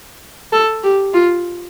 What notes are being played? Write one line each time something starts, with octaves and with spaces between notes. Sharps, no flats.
A4
G4
F4